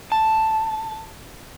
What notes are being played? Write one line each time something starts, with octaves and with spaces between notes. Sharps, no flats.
A5